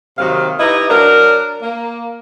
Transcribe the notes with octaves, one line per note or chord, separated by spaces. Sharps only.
D#2 C3 D#3 F#3 F5
D#4 E4 G4 B4 D#5
F#3 D4 A#4
A#3